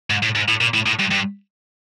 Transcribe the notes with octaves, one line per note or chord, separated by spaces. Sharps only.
G#2
A2
G#2
A2
A#2
A2
A2
G2
G2